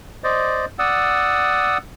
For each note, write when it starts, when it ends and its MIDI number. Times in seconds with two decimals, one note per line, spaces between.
0.24 0.66 72
0.24 0.66 74
0.24 0.66 75
0.79 1.78 74
0.79 1.78 78
0.79 1.78 87
0.79 1.78 88